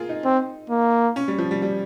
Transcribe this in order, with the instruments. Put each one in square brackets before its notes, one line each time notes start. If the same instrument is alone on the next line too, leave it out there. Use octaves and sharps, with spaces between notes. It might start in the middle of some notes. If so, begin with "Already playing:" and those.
Already playing: [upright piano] F4 G#4 A#4
D#4
[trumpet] C4
A#3
[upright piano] C#4
G3
F3
G3
G3